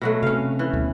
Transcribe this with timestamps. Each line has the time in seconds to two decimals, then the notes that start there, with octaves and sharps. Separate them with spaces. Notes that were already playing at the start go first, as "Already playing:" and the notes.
0.01 B2 F#3 A3
0.23 C3 C#4 F5
0.59 E3
0.73 D2 B2 G3